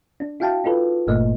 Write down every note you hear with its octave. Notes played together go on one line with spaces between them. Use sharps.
D4
E4 F#4 F5 G5 A5
D#4 F4 A4 B4
G1 G2 A#2 A3 A#3 D#5